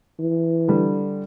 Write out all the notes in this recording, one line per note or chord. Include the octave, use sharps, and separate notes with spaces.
E3
D3 G3